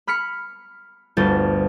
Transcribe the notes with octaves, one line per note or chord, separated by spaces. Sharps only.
B5 F6 B6 C#7
G1 D2 A5 G6 A6